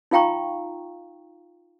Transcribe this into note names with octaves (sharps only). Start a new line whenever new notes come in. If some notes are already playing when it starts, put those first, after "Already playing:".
D#4 F4 F5 G5 A#5 C#6